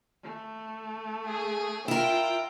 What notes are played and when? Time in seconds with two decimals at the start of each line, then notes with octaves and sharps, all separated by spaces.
0.23 A3
1.28 G#4
1.88 E4 F4 A#4 G5